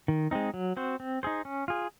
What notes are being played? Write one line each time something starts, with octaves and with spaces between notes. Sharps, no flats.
D#3
G#3 C4 D#4
F#3
C4 F#4 C5
C4
D#4 G#4 C5
C#4
F4 G#4